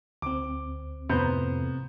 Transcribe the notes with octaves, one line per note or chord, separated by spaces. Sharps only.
D2 C4 D6
F2 A2 C3 B3 C5 A#5 G6